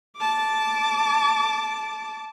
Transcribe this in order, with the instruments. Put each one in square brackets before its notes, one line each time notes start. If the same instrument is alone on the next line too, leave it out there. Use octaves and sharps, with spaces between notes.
[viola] A5 D6